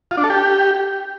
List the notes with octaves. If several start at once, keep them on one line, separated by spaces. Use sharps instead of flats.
F4
D4
A4
G4